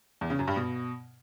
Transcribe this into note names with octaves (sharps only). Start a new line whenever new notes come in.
E2
C#3
F#2
G2
B2